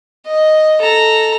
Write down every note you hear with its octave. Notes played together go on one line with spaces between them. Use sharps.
D#5
A4 A#5